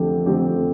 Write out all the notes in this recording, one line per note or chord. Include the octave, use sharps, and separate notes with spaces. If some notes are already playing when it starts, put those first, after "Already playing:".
Already playing: F2 D3 A3 C4 G4
F2 D3 A3 C4 G4